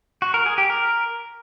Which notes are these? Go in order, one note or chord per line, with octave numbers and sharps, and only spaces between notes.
F#4
A#4
G#4
G4
A#4